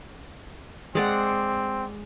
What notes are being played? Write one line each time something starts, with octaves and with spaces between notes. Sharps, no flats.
G#3 C4 D5 F#5